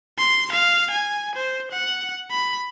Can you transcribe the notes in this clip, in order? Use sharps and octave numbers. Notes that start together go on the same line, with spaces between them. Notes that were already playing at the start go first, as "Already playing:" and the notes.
C6
F5
G#5
C5
F#5
B5